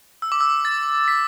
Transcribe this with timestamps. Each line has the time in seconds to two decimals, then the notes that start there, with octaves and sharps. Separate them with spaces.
0.22 E6
0.32 D6
0.41 E6
0.65 A6
1.08 B6